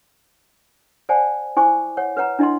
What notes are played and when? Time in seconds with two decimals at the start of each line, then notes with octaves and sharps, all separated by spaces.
1.09 C5 D5 F#5 G#5 A5
1.57 E4 C5 G5 G#5 C#6 D6
1.97 C#5 F#5
2.17 B4 C#5 F#5 A#5
2.39 D4 E4 D#5 F#5 C6